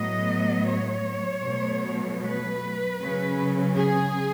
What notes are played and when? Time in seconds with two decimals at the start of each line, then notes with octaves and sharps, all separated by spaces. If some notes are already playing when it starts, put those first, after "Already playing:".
Already playing: A2 F#3 B3 D#5
0.68 C#5
1.44 B2 F#3 A3
2.22 B4
3.00 C#3 F#3 C#4
3.76 G#4